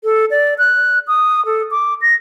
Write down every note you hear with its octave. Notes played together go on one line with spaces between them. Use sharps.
A4
D5
F#6
D#6
A4
D6
A#6